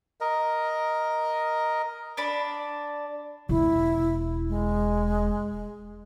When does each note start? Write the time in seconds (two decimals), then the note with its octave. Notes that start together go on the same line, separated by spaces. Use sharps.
0.21 A#4 D#5
2.17 D4 D5 B5
3.49 E1 E4
4.49 G#3